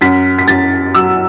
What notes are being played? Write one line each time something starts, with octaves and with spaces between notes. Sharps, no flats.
F#2 B6
B6
F#2 A6
F#3 E6